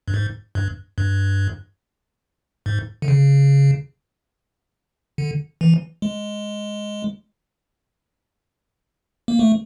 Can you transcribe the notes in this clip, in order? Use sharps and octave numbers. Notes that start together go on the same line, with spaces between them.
G2
G#2
G2
G2
G#2
D3
C#3
D3
E3
G#3
A#3
A3